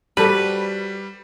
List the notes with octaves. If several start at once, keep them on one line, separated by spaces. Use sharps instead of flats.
G3 F#4 A4 B4 C5